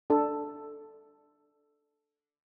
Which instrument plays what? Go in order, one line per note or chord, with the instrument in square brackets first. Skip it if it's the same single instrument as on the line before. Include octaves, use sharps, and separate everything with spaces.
[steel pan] D4 A4